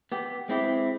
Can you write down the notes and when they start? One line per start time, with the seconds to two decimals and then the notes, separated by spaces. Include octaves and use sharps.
0.12 B3 G4
0.49 G#3 C4 E4 G4